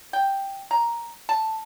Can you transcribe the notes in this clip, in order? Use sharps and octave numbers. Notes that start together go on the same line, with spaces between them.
G5
A#5
A5